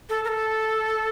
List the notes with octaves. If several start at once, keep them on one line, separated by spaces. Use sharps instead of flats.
A4
A#4
A4